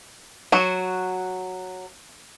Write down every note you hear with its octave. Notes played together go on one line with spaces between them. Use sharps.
F#3 F#4